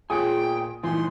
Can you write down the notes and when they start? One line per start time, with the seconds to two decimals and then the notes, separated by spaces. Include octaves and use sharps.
0.10 A#2 F4 G#4 C#5 G5 G#5 D#6
0.83 G2 A#2 E3 D#4 G#5 C6